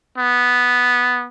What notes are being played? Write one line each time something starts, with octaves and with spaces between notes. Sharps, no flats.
B3